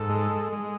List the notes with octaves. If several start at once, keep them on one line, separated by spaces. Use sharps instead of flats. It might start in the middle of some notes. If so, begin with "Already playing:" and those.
Already playing: G#2 A4
G#3
G#3